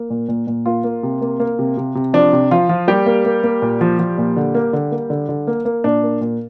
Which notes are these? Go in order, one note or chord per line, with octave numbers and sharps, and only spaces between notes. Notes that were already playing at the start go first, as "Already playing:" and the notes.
Already playing: A#3
A#2
A#2
A#2
A#3 F4
A#3
C3
A#3
A#3
C3
C3
C3
F3 D4
C3
F3 F4
F3
G3 A#3 G4
A#3
A#3
A#3
A#2
F3
F3
A#2
D3
A#3
D3
A#3
D3
D3
A#3
A#3
A#2 D4
A#3
A#2